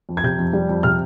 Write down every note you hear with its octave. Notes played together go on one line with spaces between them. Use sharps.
F2
G#6
C3 G6
F2
G3
F2
C3 F6